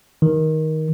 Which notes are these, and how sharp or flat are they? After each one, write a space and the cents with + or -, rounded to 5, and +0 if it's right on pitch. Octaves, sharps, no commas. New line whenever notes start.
D#3 +15